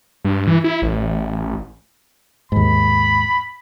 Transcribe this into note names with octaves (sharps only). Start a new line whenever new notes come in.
G2
E3
E4
A1
D#2 G#2 B5